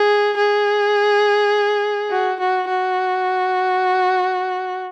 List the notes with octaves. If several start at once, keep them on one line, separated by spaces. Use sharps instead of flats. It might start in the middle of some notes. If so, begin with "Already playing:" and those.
Already playing: G#4
G#4
F#4
F#4
F#4